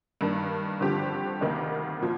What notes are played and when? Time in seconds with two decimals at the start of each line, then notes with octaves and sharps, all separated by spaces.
0.21 G2 D#3 A#3 D4
0.81 G2 D3 F3 C4 G4
1.41 D2 C3 D#3 A#3 D#4
2.01 A#2 F3